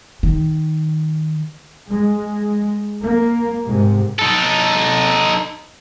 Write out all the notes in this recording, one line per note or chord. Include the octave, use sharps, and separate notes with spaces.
D#3
G#3
A#3
G#2 C3
D#4 A4